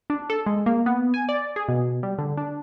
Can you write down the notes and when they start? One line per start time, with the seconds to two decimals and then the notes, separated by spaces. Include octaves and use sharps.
0.10 D4
0.30 A4
0.46 G#3
0.66 A#3
0.86 B3
1.14 G#5
1.29 D5
1.56 G#4
1.68 B2
2.03 G3
2.18 D3
2.37 D4